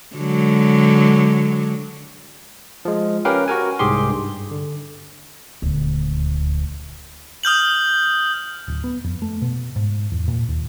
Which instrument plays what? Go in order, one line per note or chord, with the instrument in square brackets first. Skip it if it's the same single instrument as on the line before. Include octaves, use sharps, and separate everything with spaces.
[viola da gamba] D3 F#3 G#3
[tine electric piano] F3 G#3
C#4 G4 A#4 B4 F5 G5
F#4 A#4 G#5
C2 G#2 G4 G#4 C6
G2
D3
[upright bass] D#1 D2
[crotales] D#6 F6 G6 F#7
[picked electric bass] D1
B3
F2
A3
B2
G#2
E2
A#2
D#2